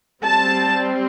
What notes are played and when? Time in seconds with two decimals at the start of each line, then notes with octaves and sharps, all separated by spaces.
0.23 G3 C4 A5